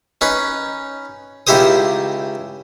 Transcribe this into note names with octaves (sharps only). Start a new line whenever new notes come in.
C#4 D#4 B4
C#2 D#4 E4 G4 C5 D#6